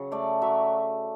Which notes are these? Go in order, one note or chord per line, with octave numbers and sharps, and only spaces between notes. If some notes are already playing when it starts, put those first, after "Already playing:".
Already playing: C#3 F#3
A3 D5
F#3 E5